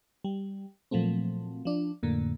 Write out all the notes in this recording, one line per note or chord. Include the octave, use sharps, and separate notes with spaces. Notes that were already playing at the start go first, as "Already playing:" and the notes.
G3
A#2 F3 F#3 A3 C4
F3 D4
F2 A2 D3 A#3